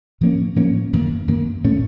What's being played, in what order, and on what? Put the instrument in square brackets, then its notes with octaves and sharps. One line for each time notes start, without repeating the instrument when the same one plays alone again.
[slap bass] A2 F3 A#3 C#4
A2 F3 A#3 C#4
F#2 D#3 A#3
F#2 D#3 A#3
A2 A3 C#4